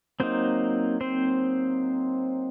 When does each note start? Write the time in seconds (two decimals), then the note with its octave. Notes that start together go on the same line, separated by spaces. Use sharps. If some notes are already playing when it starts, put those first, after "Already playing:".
0.20 F#3 A#3 C4 D#4 C5
1.01 C4 C5